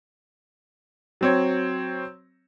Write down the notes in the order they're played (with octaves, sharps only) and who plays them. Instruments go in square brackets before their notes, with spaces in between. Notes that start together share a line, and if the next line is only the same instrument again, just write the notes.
[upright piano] F#3 C4 C#5